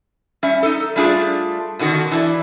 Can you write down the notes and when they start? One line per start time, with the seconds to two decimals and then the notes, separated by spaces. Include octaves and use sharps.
0.43 G3 C#4 E5
0.63 D#4 A4
0.96 G3 A3 D4 F4 G#4
1.79 B2 D3 D#3 F#4
2.12 E3 D4 E4